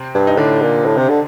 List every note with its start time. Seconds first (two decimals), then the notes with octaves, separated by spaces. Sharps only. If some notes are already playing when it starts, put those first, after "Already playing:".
Already playing: C3 C4
0.15 G2
0.27 D#4
0.37 A2 D3 D4
0.62 A#2
0.86 A2
0.97 C3
1.09 D3